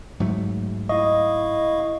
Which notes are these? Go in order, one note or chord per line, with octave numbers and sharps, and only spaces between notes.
G#2 F#3 A3
E4 D#5 F5 C#6